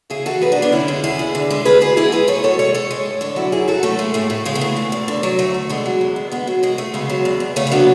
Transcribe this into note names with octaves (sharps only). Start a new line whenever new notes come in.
C#3 E4 G#4
E3 F#4 A4
F#2 G#4 B4
D4 F#4
F#2
B3 D4
D3 C#4 E4
G#3
E2 E4 G#4
E2
D3
G#3
D2 G#4 B4
D2 G#4 B4
E3 E4 G#4
G#3 G#4 B4
F#2 A4 C#5
F#2 A4 C#5
G#3 A4 C#5
A2 A4 C#5
G#3
A2
D3 A4 C#5
F#3 C#4 E4
F#2 E4 G#4
F#2 F#4 A4
E3 A3 C#4
G#3 A3
A2 A3
A2
C#3 G#3
B3
E3 A3
E2
E2
D3
F#3
D2 A3
D2
D3 G#3 B3
F#3
E2
E2
D3 G#3 B3
F#3
F#2 G#3
F#2 A3
C#3 G#3 B3
F#3
E2
E2
C#3 A3 C#4
E4
F#3 B3 D4